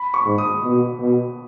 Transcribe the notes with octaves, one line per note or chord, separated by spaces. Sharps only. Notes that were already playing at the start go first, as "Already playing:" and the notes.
Already playing: B5
C#6
G#2
D#6
B2
B2